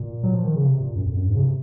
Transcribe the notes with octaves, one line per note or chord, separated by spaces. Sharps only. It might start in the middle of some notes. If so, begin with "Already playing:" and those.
Already playing: A#2
F#3
F3
D#3
C#3
C3
A#2
F#2
F2
F#2
G#2
C#3
C3